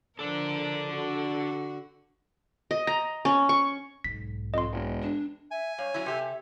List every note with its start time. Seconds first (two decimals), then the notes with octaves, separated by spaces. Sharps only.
0.19 D3 F3 D4 A4 A#4
0.90 D3 F#4
2.71 D#5
2.87 A#5
3.25 C#4
3.49 C#6
4.04 B1 G#2 B6
4.54 F2 D#5 C6
4.72 E1
5.02 D4
5.51 E5 G#5
5.78 G2 C#5 F5
5.94 F#3 C#4 E4
6.06 C3 G4 A4 E5